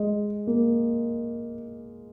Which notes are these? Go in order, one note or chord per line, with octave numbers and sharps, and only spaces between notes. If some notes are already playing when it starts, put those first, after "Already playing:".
Already playing: G#3
A#3